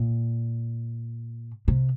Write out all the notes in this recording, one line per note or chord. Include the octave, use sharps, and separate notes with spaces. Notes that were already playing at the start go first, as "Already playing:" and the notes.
Already playing: A#2
C3